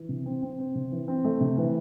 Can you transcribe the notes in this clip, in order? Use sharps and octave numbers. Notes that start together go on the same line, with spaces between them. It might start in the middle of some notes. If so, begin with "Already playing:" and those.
Already playing: E3
C3
C4
C4
C4
C3
E3
C4
A3
C3
E3